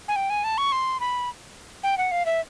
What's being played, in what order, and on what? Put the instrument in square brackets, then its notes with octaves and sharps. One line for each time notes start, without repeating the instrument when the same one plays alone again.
[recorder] G#5
G5
G#5
A5
C#6
C6
B5
G5
F#5
F5
E5